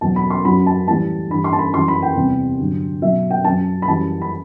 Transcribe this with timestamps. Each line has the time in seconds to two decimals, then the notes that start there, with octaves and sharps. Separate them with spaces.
0.01 E2 B2 F#3 A5
0.16 B5
0.30 C6
0.45 F#2 F#3 B5
0.66 A5
0.88 A2 E3 G3 A5
1.30 G2 E3 G3 B5
1.44 C6
1.53 A5
1.59 B5
1.74 F#2 E3 G3 C6
1.88 B5
2.02 G5
2.16 E2 C3 G3
2.59 G2 D3 F#3
3.02 B2 F#3 E5
3.30 G5
3.44 F#2 F#3 A5
3.82 B5
3.88 F#2 E3 G3 A5
4.22 B5